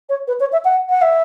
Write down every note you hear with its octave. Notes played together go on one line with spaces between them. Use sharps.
C#5
B4
C#5
E5
F#5
F#5
E5